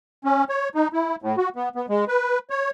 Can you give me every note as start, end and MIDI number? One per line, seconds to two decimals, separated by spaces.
0.25 0.44 61
0.49 0.69 73
0.75 0.88 63
0.93 1.16 64
1.22 1.36 45
1.37 1.49 66
1.56 1.69 59
1.76 1.86 59
1.89 2.05 56
2.08 2.39 71
2.50 2.70 73